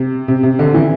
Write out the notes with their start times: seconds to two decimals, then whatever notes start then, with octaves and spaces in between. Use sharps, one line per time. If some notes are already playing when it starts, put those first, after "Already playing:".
Already playing: C3
0.28 C3
0.43 C3
0.59 D3
0.74 E3